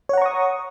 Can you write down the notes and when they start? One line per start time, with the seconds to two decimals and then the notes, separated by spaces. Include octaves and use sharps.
0.09 C#5
0.13 F#5
0.17 A#5
0.22 C#6
0.26 D#6